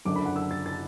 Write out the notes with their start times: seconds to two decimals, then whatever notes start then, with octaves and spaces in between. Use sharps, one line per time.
0.05 F#1 F#2 D3 D6
0.16 B5
0.26 F#5
0.36 E6
0.51 A6
0.66 A6